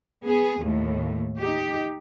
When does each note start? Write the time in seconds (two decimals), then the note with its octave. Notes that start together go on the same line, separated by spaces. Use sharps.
0.24 B3 G#4
0.62 D#2 A2
1.39 D#4 G4